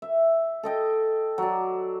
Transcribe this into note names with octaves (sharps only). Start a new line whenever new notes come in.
E5
A4 D#5 G5
F#3 D5